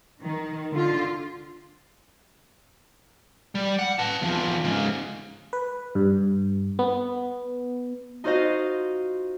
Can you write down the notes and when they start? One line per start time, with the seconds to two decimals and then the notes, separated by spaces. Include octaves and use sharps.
0.23 D#3
0.73 D3 F4
3.55 G3
3.79 F#5
3.99 B4 A5
4.22 E2 F3
4.64 G#2 C#3
5.53 B4
5.95 G2
6.79 B3
8.24 D#4 F4 F#4 C5 D#5 F5